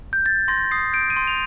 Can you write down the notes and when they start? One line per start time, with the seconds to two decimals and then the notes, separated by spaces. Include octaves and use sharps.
0.13 G6
0.26 G6 A6
0.48 C6 A#6
0.71 D#6 C7
0.93 G6 D7
1.10 D#7
1.16 C6
1.27 F7